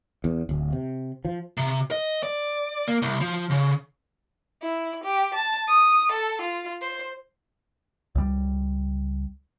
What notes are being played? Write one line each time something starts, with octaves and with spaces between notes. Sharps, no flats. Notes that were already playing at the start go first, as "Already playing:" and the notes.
E2
D1
C3
F3
C3
D#5
D5
A#3
C2
F3
C#3
E4
G4
A5
D#6
A4
F4
C5
C#2 G3